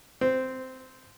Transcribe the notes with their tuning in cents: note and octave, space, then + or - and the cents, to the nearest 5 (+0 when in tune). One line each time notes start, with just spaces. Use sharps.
C4 -10